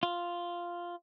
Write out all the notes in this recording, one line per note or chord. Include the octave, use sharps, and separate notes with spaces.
F4